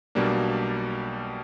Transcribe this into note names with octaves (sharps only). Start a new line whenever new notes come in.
B1 B2 G3 A#3 D4